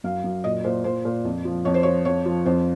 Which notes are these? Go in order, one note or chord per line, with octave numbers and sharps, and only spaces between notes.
F#2 F5
F#2
A#2 D#5
A#2 C5
A#2 C5
A#2
F2
F3
F2 C#5
C5
F3 C#5
F2 C#5
F3
F2 C5